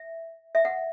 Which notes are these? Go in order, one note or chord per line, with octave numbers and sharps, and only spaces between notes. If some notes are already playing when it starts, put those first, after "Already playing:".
Already playing: E5
E5
F#5